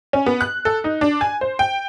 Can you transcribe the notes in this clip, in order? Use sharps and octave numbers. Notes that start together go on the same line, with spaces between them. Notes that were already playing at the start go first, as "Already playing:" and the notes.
C#4
B3
F#6
A4
D#4
D4
G#5
C5
G5